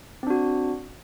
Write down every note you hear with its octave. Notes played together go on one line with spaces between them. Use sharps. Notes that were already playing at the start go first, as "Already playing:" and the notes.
C4 D4 F#4